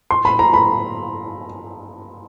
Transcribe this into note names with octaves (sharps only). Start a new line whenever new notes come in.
C6
B5
A#5
B5